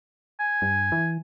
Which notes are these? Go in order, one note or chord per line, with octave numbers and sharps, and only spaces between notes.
G#5
G2
E3